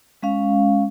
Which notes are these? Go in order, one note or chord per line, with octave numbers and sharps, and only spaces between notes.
G#3 C#4 F5